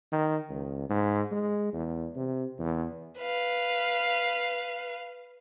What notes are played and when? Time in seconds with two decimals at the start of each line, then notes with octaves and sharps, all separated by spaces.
0.12 D#3
0.50 C#2
0.89 G#2
1.32 G#3
1.73 E2
2.16 C3
2.59 E2
3.19 B4 F5